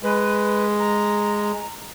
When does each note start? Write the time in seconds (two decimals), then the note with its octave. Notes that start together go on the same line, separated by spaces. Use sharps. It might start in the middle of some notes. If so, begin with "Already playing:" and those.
0.03 G#3 B4
0.79 A#5